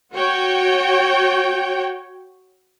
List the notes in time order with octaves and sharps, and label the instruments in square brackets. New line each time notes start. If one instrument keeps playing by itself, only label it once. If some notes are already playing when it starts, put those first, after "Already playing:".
[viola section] F#4 C#5 G5